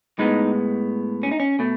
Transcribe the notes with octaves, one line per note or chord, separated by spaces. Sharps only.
A2 G#3 B3 D#4
C#4
D#4
C#4
B2 A3